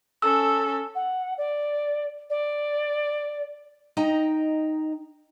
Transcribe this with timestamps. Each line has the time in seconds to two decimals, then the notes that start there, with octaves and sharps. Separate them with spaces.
0.22 C#4 A4 E6
0.94 F#5
1.37 D5
2.30 D5
3.97 D#4 D#5 G5 A#5